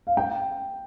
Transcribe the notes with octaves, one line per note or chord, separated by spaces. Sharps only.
F5
G5